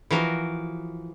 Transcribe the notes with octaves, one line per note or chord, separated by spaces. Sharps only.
E3 F3 F#4 A#4